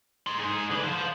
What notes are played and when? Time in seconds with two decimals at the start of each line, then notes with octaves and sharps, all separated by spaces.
0.27 D#4 C6
0.39 G#2 G#4
0.71 D3 B4
0.84 F3 C5